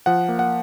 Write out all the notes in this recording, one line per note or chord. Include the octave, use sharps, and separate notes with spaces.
F3 F#5
A#3
F#5